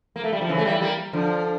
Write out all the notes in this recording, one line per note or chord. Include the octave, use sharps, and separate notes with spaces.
A#3
A3
G3
F3
C#3 E3
A3
E3 G3
G3 A#3
D3 F3